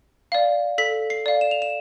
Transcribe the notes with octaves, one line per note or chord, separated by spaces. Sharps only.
D5 F5
A4 B6
C7
D5 F5
E7
F7
E7